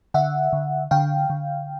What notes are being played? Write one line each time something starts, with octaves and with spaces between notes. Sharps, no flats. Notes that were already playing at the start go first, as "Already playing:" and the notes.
D3 E5 F#5
D3
D3 F5 G5
D3